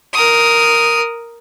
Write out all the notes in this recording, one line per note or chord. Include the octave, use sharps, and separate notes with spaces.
A#4 D#6